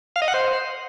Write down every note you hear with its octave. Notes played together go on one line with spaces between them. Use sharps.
F5
D#5
F#5
C5